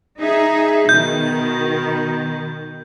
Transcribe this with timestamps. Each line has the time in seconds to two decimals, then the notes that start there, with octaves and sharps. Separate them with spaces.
0.19 D#4 G#4 E5
0.89 B2 D#3 G6